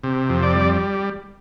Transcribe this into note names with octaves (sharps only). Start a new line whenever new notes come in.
C3
F2
D5
G3